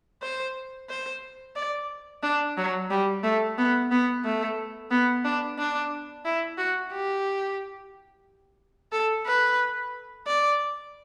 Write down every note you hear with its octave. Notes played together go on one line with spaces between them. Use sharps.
C5
C5
D5
D4
F#3
G3
A3
B3
B3
A3
B3
D4
D4
E4
F#4
G4
A4
B4
D5